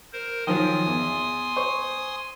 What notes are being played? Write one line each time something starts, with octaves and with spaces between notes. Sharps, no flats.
A#4 C5
D#3 F3 F#3 G#5 C6 D#6
E2
C5 C#6